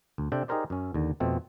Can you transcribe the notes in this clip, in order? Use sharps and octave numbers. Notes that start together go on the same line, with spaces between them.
D2
C3 D4 A4 C5 G5
D#4 G4 G#4 A#4 C5 D5
F#2 C#4
D#2 D3
F2 B2 A3 C4